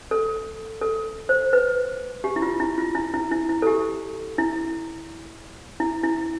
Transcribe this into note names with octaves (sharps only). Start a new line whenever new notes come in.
A4
A4
C5
B4
G4
E4
F4
E4
F4
E4
E4
E4
E4
A4
G4
E4
E4
E4